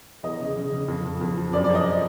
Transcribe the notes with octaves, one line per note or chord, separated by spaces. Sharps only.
E2 D#5
C#3
C#3
C#3
F2
F2
F2
F3
F#2 D5
D5
F3
D#5